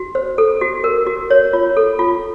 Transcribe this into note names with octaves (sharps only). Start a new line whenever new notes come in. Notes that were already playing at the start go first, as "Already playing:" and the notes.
Already playing: F#4
C5
A4
F#4
A#4
F#4
C#5
F4
A4
F4